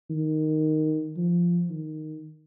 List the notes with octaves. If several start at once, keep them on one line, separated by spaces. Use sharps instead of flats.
D#3
F3
D#3